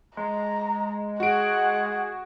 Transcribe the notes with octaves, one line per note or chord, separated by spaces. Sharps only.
G#3 A#5
F#4 G#4 F#5 D7